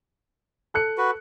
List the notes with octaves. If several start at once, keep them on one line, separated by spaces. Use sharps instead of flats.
A4 F#6 C#7
F#4 B4